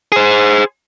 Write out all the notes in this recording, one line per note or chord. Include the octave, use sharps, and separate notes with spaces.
G#4 C5